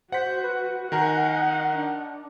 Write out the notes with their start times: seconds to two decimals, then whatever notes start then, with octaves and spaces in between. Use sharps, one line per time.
0.12 F#4 C5 F#5 B6
0.43 B4
0.92 D#3 A#4 D#5 F#5 G#5 A#5
1.74 D4